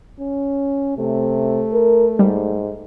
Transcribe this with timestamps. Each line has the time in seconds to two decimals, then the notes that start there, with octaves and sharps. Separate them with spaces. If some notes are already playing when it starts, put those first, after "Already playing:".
0.19 C#4
0.98 C3 A3
1.73 A#4
2.19 G#2 G3